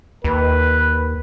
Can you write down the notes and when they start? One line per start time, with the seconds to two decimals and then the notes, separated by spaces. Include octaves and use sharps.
0.24 D#2 B4